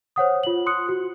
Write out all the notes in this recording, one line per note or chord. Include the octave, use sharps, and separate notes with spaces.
C5 C#5 F#5 D#6
F4 F#7
C6 D#6 F#6 C#7
F#4